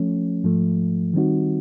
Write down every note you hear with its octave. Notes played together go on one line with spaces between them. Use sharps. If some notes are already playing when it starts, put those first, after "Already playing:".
Already playing: F3 A3 C#4
G#2 F3 A3
D#3 G3 C4 D#4 F#4